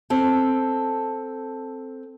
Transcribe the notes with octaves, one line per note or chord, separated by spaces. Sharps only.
C4 A4